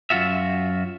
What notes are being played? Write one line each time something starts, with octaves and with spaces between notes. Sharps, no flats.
F#2 C3 F4 F#4 E5